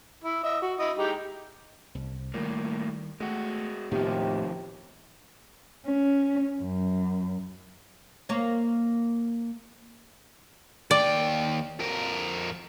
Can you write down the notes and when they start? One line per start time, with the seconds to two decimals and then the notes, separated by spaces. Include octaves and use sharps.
0.24 E4
0.44 D#5 E5
0.62 F#4
0.79 E4 D#5
0.97 G#3 D#4 G4
1.95 C2
2.34 A2 D#3 G3 A#3
3.20 G#3 A3 F#4
3.91 D#2 A2 C3 D#3 F3 B3 G4
5.86 C#4
6.62 F#2
8.29 A#3 C#5
10.91 D#2 D5 G5
11.80 F2 A#4